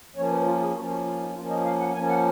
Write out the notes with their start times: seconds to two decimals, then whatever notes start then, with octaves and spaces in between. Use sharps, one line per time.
0.16 F3 A#3 C#4 C#5
0.31 B4
0.46 F4
0.61 G#4
0.76 F3 A#3 C#4 F#4
0.91 F#4
1.05 F4
1.20 D#4
1.35 F3 A#3 C#4 F4
1.50 D#5
1.65 F5
1.80 F#5
1.94 F3 A#3 C#4 G#5
2.09 F#5